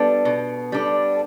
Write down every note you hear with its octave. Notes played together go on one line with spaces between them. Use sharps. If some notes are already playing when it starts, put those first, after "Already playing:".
Already playing: G3 B3 D4 A4
B2
G3 D4 A4